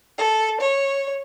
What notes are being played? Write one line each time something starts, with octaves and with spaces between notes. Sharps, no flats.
A4
C#5